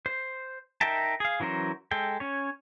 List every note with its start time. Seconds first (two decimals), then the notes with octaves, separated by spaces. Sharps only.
0.06 C5
0.81 D#4 A#4 E5 G5 A5
1.20 G#4 F5
1.40 E3 F#3 C#4 A#4 C5
1.91 G#3 A4 G5
2.20 C#4 C#5